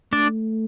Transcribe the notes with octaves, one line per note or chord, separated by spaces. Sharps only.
A3 D4 D5